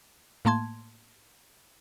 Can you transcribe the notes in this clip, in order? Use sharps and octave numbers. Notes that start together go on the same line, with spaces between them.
A2 A3 A#3 A5 C6 G#6